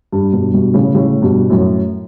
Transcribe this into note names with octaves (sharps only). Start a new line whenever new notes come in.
G2
G2 B2
G2 B2
A2 C#3
A2 C#3
G2 B2
F#2 A2